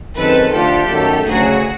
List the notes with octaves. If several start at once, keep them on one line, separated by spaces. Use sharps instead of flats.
F#2 D#3 G#3 C4 A4 B4
D3 F3 A3 D4 F4 G4 A4
F#2 D#3 F#3 A3
D2 C#3 F#3 F#4 G#4